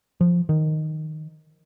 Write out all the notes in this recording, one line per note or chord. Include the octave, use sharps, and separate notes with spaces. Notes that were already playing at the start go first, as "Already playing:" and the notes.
F3
D#3